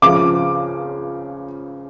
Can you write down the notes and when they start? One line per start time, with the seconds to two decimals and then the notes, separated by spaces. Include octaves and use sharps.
0.02 C#2 C#3 F3 D6